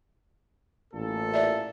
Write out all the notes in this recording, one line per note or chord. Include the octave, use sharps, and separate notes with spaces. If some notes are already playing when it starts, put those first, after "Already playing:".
A1 A#2 A4
D5 E5